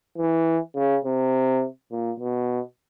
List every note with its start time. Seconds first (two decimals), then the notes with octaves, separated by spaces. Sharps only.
0.18 E3
0.76 C#3
1.05 C3
1.91 A#2
2.20 B2